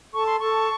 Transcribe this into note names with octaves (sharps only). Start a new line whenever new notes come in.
A4 A5 C#6
C6
A4 A5 C#6